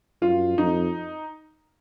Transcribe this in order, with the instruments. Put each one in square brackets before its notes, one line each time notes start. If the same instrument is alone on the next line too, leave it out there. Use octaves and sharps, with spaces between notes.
[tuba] F#2 [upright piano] F4
[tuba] F2 [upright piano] D#4